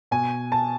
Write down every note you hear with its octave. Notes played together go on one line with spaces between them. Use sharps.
B2 G#5
A5